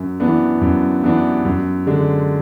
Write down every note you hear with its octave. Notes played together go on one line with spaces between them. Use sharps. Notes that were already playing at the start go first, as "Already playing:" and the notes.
Already playing: F#2
E3 B3 D4
F#2
E3 B3 D4
F#2
D3 G#3 D4